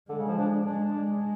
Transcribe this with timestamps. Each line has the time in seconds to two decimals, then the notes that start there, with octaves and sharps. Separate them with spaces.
0.09 D3 G#3
0.19 C#3
0.28 F3
0.38 D4
0.66 G#3 D4
0.80 D4
0.95 G#3